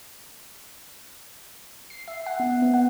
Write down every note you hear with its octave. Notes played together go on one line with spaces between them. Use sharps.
C7
E5
F#5
B3
B3
F#5